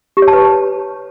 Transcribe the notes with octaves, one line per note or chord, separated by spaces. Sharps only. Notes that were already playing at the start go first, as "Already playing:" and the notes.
G4
C#5
A5
B4